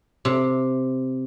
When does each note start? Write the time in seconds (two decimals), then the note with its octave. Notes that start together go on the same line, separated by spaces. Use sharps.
0.25 C3